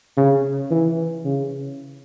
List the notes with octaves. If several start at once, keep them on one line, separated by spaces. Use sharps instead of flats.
C#3
E3
C#3